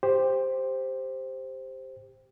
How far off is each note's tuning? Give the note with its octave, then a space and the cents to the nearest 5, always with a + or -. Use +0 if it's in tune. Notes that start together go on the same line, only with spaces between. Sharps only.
G4 +10 C5 +0